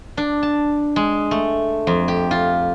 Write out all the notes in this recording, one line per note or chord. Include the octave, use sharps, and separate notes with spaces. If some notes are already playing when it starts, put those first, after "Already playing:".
D4
A5
G#3
A3
F2
G4
F4